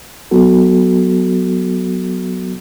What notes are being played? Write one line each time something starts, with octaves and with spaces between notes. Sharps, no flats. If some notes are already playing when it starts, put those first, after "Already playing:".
F#3 B3 F#4 A4